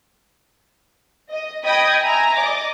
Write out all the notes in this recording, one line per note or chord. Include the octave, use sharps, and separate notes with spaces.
D#5
D#5 G5 B5 D#6 G#6
E5 G#5 A#5
D5 D#5 D6